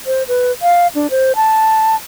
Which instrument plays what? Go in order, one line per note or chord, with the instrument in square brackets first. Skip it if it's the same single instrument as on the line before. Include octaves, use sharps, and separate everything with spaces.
[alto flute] C5
B4
F5
D4
C5
A5